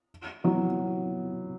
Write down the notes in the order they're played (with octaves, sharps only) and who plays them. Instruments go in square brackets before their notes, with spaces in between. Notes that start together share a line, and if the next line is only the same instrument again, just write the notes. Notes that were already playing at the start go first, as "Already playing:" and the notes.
[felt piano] E3 F#3